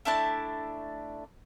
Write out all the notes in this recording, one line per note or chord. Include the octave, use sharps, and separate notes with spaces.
A3 D4 E4 A5